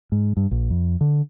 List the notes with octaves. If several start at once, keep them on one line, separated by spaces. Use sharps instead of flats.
G#2
G2
A#1
F2
D3